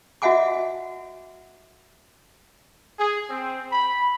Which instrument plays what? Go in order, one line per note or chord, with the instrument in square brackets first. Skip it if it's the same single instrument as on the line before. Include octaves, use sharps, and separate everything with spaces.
[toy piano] F#4 D#5 E5 F#5 G#5 D6
[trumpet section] G#4
C4
B5